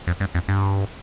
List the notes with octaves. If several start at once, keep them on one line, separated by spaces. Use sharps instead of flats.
F2
G2
F2
G2